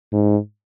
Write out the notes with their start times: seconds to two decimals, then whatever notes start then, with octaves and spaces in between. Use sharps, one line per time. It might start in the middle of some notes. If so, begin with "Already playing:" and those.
0.12 G#2